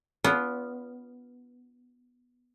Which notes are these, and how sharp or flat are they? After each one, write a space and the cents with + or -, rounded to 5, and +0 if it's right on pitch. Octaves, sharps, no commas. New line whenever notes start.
B3 -5 D4 -45 F4 +0